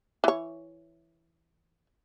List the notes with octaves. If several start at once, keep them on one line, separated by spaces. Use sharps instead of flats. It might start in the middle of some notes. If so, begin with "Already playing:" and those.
E3 C#5